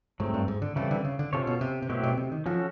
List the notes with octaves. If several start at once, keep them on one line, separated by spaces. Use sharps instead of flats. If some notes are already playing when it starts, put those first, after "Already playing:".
G#2 F#3 A3 C4
G2
G#2
D3
C#3 E3 G3 C4 E4 A4
D3
C#3
D3
C3 C#4 F4 A4 C#5
B2
C3
C3
B2 F#3 A3 C4 E4 G4
B2
C3
D#3
F3 C#4 F#4 A4